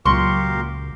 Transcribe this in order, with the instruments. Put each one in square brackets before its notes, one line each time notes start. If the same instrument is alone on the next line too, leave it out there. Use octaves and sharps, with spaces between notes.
[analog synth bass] C#2 [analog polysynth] A#2 F#3 [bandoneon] G4 A#4 F5 [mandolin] C6 C#6